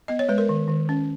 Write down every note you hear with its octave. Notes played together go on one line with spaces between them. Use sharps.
B3 D#5
C#5
G#3 B4
A#4
D#3
D#3
C#4